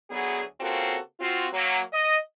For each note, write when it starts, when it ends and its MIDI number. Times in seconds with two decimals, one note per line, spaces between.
0.11 0.43 38
0.11 0.43 54
0.11 0.43 59
0.11 0.43 68
0.60 0.97 49
0.60 0.97 58
0.60 0.97 60
0.60 0.97 65
0.60 0.97 66
0.60 0.97 69
1.20 1.47 60
1.20 1.47 65
1.20 1.47 66
1.53 1.80 54
1.53 1.80 58
1.93 2.18 75